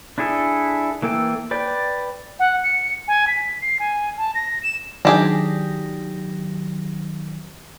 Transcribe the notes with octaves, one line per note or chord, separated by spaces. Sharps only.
D4 E4 G#4 A4
E3 A#3 A4 G5
B4 D5 G5
F#5
C#7
G#5
B6
C7
G#5
A5
A#6
E7
D#3 F#3 D4 G4 G#4 A#6